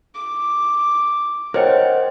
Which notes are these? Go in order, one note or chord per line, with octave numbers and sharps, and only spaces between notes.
D6
A#4 C5 C#5 D#5 F#5 G5